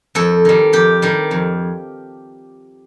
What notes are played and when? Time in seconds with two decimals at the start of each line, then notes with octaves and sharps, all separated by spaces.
0.15 F2 A4
0.45 D#3 G3
0.73 F2 G4
1.02 D#3 G3
1.31 F2